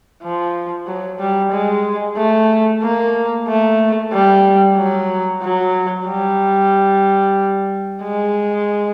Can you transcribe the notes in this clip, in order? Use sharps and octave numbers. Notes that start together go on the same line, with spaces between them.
F3
F#3
G3
G#3
A3
A#3
A3
G3
F#3
F#3
G3
G#3